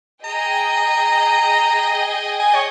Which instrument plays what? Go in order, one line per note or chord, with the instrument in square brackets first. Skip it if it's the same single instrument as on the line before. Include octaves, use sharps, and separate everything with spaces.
[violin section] G#4 D#5 G5 [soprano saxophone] A#5
[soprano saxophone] G#5
C#5